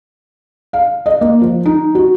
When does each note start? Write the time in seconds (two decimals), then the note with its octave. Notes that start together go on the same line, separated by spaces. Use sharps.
0.73 F5
1.06 D#5
1.21 A#3
1.41 F3
1.66 D#4
1.95 F#4